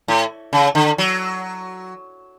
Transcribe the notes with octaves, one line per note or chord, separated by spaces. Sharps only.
A2
C#3
D3
F#3